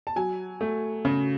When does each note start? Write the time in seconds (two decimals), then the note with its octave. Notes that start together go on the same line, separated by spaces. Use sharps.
0.07 A5
0.16 F#3 G#5
0.61 A3
1.05 C#3